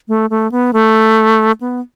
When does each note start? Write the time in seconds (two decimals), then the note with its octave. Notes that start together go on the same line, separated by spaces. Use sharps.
0.08 A3
0.30 A3
0.52 B3
0.73 A3
1.61 B3